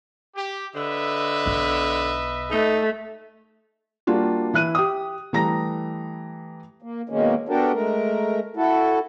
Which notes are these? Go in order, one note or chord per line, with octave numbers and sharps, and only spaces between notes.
G4
D3 B4 D#5 E5
B1 B2
A3 D#4
G3 A#3 D4 F4 F#4
E3 E4 F#6 D#7
G4 D#6
E3 G3 A3 A#5 A#6
A#3
B2 D#3 G#3 A#3 C#4
B3 D4 F#4 G4 A4 A#4
G#3 A3 A#4
E4 F#4 A4